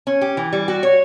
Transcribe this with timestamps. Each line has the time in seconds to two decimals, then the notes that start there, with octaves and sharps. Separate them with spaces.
0.07 C#4
0.21 G4
0.37 E3
0.53 G3
0.68 F#4
0.83 C#5